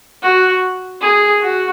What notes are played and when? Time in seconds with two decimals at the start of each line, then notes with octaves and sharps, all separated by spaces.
0.23 F#4
1.01 G#4
1.41 F#4